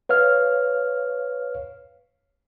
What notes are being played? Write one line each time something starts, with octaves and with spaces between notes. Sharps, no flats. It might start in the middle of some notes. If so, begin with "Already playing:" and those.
B4 C#5 F5 F6